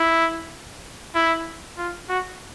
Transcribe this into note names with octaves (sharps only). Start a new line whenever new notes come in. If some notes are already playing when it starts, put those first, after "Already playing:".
Already playing: E4
E4
F4
F#4